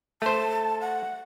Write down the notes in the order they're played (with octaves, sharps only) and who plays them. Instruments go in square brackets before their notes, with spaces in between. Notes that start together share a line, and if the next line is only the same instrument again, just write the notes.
[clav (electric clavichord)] A3 C5 [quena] A5
[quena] F#5